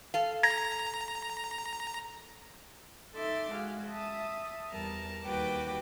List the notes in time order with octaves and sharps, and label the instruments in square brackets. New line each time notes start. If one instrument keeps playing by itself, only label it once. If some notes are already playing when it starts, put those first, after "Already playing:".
[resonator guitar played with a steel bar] A4 F5
[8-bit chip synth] A#5 [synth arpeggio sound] G#6 A#6
[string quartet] D#4 A4 E5 C6 D6
G#3 F#4 G#4 F5
E5 A5 D#6
E2 G3 A#4 A5 A#5
D#2 G3 F#4 B4 G5 D6